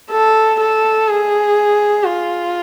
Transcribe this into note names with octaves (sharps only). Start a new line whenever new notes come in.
A4
A4
G#4
F4